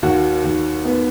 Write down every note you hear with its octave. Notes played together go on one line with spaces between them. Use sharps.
D#2 F#4
D#2
B3